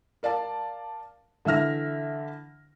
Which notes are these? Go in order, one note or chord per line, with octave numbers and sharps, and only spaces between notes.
A#4 D5 F5 A5
D3 E3 E5 F6 A#6